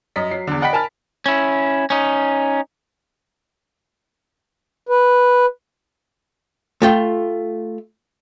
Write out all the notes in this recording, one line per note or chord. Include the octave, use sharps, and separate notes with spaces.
F#2 D#5 B6
F#3 C7
E2 D3
D5 D#5 F#5 G5 B5 B6
A#4 G#5 A5 B5 F6 A6
C#4 E4
C#4 D#4
B4
A3 F4 G5